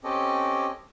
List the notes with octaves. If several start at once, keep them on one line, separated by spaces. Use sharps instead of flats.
C4 C#4 G4 A4 D#5